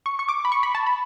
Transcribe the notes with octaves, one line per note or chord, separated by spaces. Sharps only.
C#6
C#6
D6
B5
C#6
B5
A5
B5